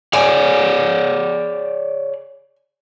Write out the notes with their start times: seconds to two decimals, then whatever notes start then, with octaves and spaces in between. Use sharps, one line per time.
0.13 G#4 C#5 D5 G#5